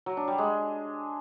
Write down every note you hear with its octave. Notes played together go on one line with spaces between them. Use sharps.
F#3
D4
G3
G#3